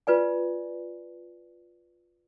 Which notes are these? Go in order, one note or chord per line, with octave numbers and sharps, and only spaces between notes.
F4 B4 D5 G#5